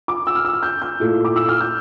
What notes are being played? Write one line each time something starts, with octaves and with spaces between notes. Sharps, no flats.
D6
E6
F6
E6
F6
G6
G6
A#2 A3 E4
D6
E6
F6
G6